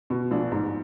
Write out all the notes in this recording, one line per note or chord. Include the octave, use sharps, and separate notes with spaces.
B2
A#1 D4
G#2